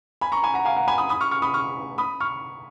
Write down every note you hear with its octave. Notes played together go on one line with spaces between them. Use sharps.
G#5 B5
A#5 C#6
G#5 B5
F#5 A#5
F5 G#5
F#5 A#5
G#5 B5
B5 D#6
B5 D#6
C#6 F6
C#6 F6
B5 D#6
C#6 F6
B5 D#6
C#6 F6